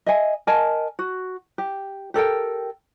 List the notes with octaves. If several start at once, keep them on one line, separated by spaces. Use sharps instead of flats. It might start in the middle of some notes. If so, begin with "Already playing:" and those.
D#5 E5 G#5
A#4 D#5 G#5 A5
F#4
G4
G4 A4 A#4 G5